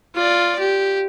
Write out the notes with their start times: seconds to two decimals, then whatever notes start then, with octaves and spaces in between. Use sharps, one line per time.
0.15 F4 D5
0.59 G4